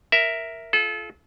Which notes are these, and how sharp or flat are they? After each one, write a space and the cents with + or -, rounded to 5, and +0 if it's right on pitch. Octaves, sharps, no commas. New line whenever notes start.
A#4 +0 E5 +0
F4 -25 A4 -35